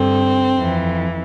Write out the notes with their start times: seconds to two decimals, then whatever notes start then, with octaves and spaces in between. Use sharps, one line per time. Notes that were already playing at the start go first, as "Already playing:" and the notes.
Already playing: G2 D3 C4
0.58 F2 E3